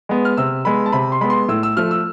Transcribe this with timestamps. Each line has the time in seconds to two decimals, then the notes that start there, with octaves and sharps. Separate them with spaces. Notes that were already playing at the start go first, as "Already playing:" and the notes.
0.09 G#3 B3
0.25 F6
0.37 C3 E6
0.65 G#3 B3 B5
0.86 A5
0.92 C3 B5
1.12 C6
1.21 G#3 B3 B5
1.30 C6
1.48 A2 E6
1.63 E6
1.77 F3 A3 F6
1.91 E6